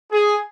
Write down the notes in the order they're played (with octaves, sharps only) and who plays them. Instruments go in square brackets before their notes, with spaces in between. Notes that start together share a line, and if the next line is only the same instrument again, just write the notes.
[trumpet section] G#4